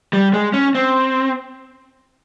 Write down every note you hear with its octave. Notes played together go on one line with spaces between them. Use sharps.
G3
G#3
C#4
C4